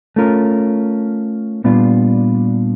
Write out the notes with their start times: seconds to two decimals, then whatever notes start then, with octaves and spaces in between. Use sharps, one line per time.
0.16 A3 C#4 F4 A#4
1.64 A#2 G3 B3 D4 F4